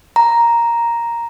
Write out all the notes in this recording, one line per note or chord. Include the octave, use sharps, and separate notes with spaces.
A#5